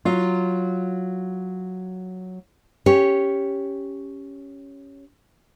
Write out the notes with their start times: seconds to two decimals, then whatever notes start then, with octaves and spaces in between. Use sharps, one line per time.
0.05 F#3 F4
2.86 C#4 G4 C#5